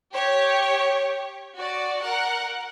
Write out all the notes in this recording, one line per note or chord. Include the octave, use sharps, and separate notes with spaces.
G4 C#5
F#4 D5
A#4 F#5